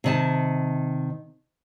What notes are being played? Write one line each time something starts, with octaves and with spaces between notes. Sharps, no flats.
C3 D#3 A5